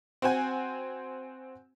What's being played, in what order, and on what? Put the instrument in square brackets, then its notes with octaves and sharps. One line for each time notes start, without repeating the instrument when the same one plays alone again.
[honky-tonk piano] C4 F#4 C5 G#5